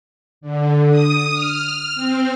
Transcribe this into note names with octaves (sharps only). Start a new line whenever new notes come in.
D3
D#6
F6
C4